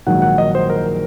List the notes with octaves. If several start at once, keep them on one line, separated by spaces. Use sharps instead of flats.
A#1 G#2 D#3 F#3 F#5
F#5
D#5
C5
A#4